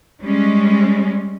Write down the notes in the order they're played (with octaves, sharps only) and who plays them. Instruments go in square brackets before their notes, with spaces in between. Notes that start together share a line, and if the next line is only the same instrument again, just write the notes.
[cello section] G3 G#3 C#4